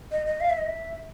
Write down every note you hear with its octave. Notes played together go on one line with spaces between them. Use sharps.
D#5
D#5
F5
E5
D#5
E5